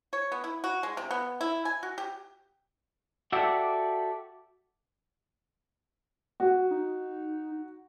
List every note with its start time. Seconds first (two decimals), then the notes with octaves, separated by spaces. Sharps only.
0.13 C#5
0.32 B3
0.44 E4
0.64 F#4
0.83 G#3
0.97 C3
1.11 B3
1.41 E4
1.65 G#5
1.83 F#4
1.98 G4
3.32 F#4 G4 A4 D5 E5 F#5
6.40 F#4
6.71 D#4